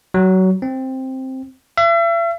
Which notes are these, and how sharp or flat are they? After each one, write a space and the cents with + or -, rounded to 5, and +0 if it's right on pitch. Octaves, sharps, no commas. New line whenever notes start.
F#3 +20
C4 +5
E5 +40